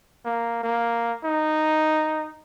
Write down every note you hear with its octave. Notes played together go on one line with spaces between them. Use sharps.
A#3
A#3
D#4